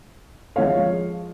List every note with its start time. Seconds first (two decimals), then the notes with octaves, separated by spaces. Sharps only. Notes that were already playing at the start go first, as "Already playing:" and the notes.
0.56 F3 G#3 C#5 F5